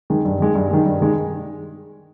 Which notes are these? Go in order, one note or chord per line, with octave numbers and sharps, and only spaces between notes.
D#3 G#3
G2
D#3 G#3
G2
D#3 G#3
G2
D#3 G#3